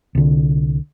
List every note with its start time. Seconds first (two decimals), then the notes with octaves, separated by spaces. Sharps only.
0.15 C2 D3